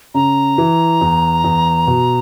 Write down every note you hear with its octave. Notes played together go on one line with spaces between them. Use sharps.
C#3 A#5
E3
E2
E2
B2